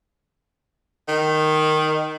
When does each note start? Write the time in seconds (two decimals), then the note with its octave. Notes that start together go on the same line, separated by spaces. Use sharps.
1.09 D#3